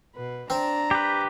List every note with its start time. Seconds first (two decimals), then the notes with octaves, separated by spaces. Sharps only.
0.16 B2 B4
0.50 C4 D4 A#5
0.91 G4 B4